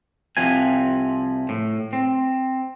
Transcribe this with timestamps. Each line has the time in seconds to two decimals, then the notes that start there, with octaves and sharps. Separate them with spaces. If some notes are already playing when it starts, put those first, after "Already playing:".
0.37 C2 C3 F3 G#5
1.49 A2
1.93 C4